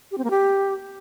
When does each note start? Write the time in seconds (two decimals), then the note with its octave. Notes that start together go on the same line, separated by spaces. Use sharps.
0.11 G4
0.18 C4
0.24 A#3
0.30 G4